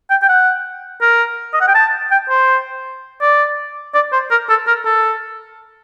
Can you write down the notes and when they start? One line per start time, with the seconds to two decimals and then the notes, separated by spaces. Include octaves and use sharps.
0.10 G5
0.22 G5
0.29 F#5
1.01 A#4
1.53 D#5
1.61 F#5
1.68 G5
1.75 A5
2.11 G5
2.30 C5
3.21 D5
3.95 D5
4.13 C5
4.31 A#4
4.49 A4
4.67 A#4
4.85 A4